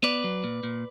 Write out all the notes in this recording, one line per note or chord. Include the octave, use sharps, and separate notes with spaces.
B3 B4 D5
F#3
A#2
A#2